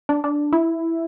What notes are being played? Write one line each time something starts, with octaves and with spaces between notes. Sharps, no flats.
D4
D4
E4